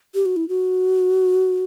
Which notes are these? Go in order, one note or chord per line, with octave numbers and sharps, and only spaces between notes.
G4
F#4
E4
F#4